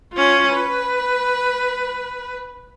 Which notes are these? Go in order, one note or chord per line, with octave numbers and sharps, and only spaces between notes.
C#4 F4
B4